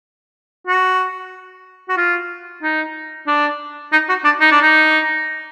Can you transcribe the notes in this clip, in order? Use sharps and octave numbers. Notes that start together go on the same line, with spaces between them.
F#4
F#4
F4
D#4
D4
D#4
F#4
D4
D#4
D4
D#4